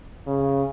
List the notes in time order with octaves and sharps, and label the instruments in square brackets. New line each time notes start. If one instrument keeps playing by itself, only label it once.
[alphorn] C#3